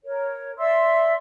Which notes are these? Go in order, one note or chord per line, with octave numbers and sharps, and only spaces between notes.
A#4 C#5
D5 E5 C6 E6